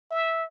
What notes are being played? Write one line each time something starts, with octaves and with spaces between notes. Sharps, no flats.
E5